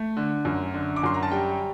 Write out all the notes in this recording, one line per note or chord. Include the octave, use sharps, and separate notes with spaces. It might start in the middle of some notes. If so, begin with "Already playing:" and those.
Already playing: A3
D3
F#2
D3
D6
F#2 C6
A#5
A5
G3 G5